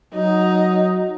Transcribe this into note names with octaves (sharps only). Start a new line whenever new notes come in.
F#3 D#4